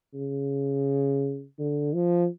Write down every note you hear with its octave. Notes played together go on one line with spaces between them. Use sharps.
C#3
D3
F3